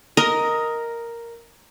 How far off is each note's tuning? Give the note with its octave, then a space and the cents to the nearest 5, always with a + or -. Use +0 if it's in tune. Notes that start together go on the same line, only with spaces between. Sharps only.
A#4 +0 D#5 +10